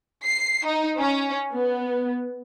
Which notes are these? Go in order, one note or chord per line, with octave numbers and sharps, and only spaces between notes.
C7
D#4
C#4
B3